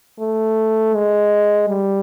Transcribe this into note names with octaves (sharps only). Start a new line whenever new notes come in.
A3
G#3
G3